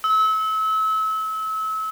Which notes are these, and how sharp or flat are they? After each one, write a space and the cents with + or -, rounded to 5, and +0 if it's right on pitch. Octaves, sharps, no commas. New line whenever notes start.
E6 -30